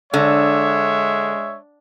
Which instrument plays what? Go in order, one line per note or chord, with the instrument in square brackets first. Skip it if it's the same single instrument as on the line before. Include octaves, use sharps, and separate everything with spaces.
[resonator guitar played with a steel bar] D3 [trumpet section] G#3 C#5 E5